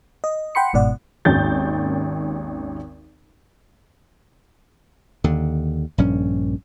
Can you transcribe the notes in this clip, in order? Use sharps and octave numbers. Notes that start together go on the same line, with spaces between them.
D#5
F#5 G5 B5 C6 C#7
G1 G#2 B2 D5 F#5
G#1 D#2 C#4 G6 A6
D#2 D3
A#1 G2 C#4